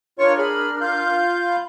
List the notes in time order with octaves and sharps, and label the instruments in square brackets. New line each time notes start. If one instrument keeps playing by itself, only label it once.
[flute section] D4 A#4 F6 [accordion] F4 C#5 C#6
[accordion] G#4 B5
F4 F5 G6
[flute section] B5